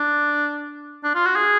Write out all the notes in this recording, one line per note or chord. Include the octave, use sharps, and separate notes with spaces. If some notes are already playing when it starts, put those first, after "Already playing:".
Already playing: D4
D4
F4
F#4
G#4